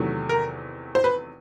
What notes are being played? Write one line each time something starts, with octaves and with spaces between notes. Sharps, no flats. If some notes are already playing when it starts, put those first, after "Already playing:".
Already playing: E2 C3 D#3 F#3 A3
A#4
C5
B4